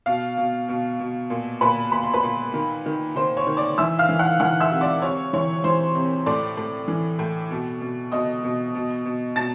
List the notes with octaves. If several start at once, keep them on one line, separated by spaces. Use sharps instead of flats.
B2 F5
B2
B2
B2
A#2
A#2 B4 B5
A#2 B5
C6
B4 B5
A#2
D#3
D#3
D#3 C5 C6
C#5 C#6
D#3
D5 D6
E3 E5 E6
F5 F6
E3
F#5 F#6
E3 F#5 F#6
E5 E6
C3
D5 D6
C3 C#5 C#6
E3 C#5 C#6
E3 C5 C6
C3
A2 D5 D6
A2
E3
A2
B2
B2
B2 D#5 D#6
B2
B2
B2
B2 A5 A6